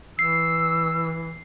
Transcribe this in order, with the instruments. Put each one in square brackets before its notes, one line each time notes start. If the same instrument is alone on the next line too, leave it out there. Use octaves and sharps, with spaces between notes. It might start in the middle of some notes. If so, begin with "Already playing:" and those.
[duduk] E3 [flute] E6 [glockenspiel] C7